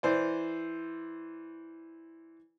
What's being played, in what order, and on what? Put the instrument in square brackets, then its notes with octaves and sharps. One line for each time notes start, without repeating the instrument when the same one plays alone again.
[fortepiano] E3 C5 D5